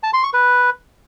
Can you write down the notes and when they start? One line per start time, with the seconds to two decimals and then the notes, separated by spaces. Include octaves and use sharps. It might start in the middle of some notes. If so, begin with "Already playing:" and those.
0.03 A5
0.13 C6
0.23 C#6
0.34 B4